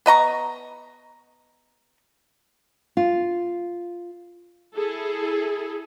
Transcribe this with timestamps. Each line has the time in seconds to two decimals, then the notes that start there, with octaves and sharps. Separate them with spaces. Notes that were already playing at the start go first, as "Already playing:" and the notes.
0.06 B3 D#5 A#5 C#6
2.97 F4
4.75 E4 G#4 A4